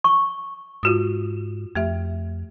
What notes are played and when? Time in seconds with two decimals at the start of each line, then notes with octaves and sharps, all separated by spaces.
0.04 C#6
0.83 G#2 F4 F#4 D#6
1.75 F2 A3 G4 E5